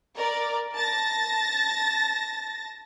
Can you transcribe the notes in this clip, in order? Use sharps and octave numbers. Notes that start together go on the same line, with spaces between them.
A#4 D5
A5 A6 A#6